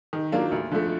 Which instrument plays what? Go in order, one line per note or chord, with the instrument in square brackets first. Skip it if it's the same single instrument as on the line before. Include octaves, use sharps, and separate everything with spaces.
[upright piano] D#3
F#3 A#3 D4 F4
D2
D3 F3 A3